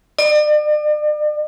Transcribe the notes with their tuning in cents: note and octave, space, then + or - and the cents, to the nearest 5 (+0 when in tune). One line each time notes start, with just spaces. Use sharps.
D5 +40